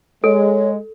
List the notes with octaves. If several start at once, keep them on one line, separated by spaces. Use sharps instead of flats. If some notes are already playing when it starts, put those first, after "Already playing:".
G#3 A4 C#5